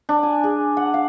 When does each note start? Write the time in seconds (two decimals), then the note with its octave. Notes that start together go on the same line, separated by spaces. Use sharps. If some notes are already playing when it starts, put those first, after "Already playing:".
0.09 D4
0.23 G#5
0.44 G#4
0.77 F#5
0.94 F5